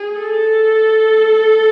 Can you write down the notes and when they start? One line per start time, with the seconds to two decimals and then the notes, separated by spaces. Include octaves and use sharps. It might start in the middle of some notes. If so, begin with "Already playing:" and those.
Already playing: G#4
0.19 A4